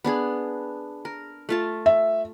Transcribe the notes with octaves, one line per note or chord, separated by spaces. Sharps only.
B3 D4 G#4
A#4
A3 F4 A5
E5